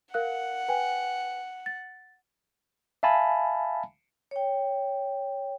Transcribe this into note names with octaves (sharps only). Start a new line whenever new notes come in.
A#4 F5 F#5 F#6
B4 G5 G#5
A6
E5 F5 G#5 A5 B5
C#5 G5